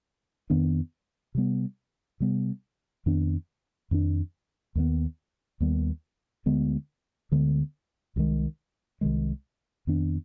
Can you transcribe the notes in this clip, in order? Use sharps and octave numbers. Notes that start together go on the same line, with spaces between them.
F2 D#3 B3 D4
C3 G3 B3
C3 G3 B3
F2 D#3 B3 D4
F2 D#3 B3 D4
D#2 D#3 G3 B3
D#2 D#3 G3 B3
D2 D3 G#3 B3
D2 D3 G#3 B3
C2 C3 D#3 G#3
C2 C3 D#3 G#3
F2 D#3 B3 D4